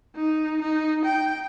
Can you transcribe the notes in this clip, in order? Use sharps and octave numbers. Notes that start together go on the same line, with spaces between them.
D#4
D#4
G5